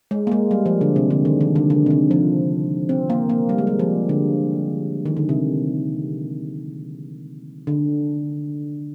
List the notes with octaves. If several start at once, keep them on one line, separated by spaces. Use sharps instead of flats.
G#3
A#3
G#3
G3
F3
D3
C3
D3
D#3
D#3
D3
D3
C3
D3
F3
C4
A#3
A#3
G3
G#3
G3
F3
D3
D#3
D3
C3
D3